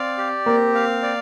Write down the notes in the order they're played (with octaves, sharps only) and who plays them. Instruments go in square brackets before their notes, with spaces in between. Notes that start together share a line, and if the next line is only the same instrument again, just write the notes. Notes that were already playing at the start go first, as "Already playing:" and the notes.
Already playing: [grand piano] C4 [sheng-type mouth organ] D5 F5
[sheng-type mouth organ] G4
[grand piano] A#3 [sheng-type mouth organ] C4
[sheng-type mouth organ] F5
D5